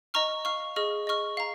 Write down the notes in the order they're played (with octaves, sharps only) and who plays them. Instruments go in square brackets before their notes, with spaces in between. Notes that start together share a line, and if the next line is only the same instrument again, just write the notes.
[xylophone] D#5 A#5 C#6 F6
F5 C#6 F6
G#4 D#5 C#6 F6
D#5 C#6 F6
F5 A#5